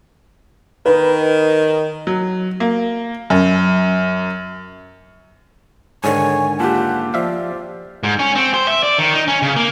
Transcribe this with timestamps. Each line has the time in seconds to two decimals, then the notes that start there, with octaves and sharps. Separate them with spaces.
0.86 D#3 B4
2.07 F#3
2.60 A#3
3.30 F#2
6.04 G#2 D3 D#3 C#5 G#5
6.60 A#3 F4 G4 F#5 A5
7.14 F3 D5 E5 F5
8.03 G#2
8.19 C#4
8.35 C4
8.54 C5
8.68 E5
8.83 D5
8.99 D#3
9.14 D#4
9.28 C#4
9.42 C#3
9.56 A#3